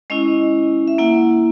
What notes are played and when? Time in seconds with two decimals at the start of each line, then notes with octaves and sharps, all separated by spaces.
0.10 G#3 C#4 E4 D#5
0.88 E5
0.98 A#3 E4 F#5